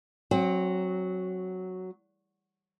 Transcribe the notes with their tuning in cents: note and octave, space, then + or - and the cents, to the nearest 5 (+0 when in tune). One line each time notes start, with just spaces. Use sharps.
F#3 +0 C4 +25 F#4 +0